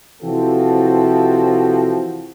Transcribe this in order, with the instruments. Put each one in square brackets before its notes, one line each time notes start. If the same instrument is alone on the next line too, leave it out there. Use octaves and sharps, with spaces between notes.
[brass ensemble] C3 E3 F3 C4 F#4 A4